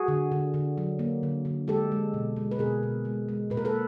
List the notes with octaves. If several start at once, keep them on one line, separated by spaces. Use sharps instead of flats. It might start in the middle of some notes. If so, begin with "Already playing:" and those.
Already playing: F#4 G#4
D3
D3
D3
F#3
A#3
D3
D3
G#3 G4 A4
G#3
B2
G#3
B4
B2 G#4 A#4
B2
G#3
G#3
A#2 B4
A#4
A4 B4